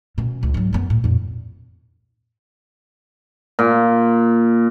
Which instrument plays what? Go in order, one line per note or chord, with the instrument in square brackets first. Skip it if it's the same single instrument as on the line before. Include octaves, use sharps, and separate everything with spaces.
[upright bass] B2 C#4
C#2
G#2 F#3
F#2 B3
A2
F2 A#2
[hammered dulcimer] A#2